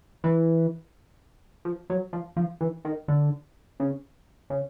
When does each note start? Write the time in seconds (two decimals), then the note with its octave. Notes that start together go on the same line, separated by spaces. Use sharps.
0.24 E3
1.65 F3
1.90 F#3
2.13 F3
2.37 F3
2.61 E3
2.85 D#3
3.08 D3
3.80 C#3
4.50 C#3